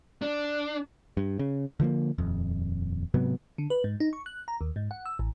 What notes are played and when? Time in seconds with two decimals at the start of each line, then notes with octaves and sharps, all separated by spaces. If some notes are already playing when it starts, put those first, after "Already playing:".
0.22 D4
1.17 G2
1.39 C#3
1.80 D3 F3 A3 A#3
2.18 D#1 F2
3.14 G#2 C3 F#3 B3
3.58 D3
3.70 B4
3.84 G#2
4.00 D#4
4.13 C#6
4.26 F#6
4.48 A#5
4.61 D#2
4.76 G#2
4.91 F#5
5.06 E6
5.19 A1